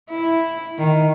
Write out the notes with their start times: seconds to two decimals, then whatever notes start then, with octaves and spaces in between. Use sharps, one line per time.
0.10 E4
0.79 D#3